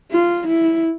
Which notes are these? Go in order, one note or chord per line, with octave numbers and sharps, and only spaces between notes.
F4
E4